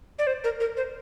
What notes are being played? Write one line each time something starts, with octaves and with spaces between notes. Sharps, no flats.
D5
C5
A#4
A#4
C5